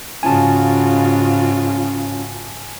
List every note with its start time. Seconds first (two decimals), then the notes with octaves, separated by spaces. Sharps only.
0.23 G#2 C#3 C#4 F4 F#4 G#5 A5